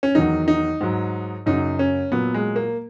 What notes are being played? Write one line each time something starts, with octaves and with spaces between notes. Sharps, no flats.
C#4
E2 D#3 F#3 D#4
D#4
G#2 F#3
F#2 C#3 F#3 D#4
C#4
A#2 F#3 B3
G#3
A#3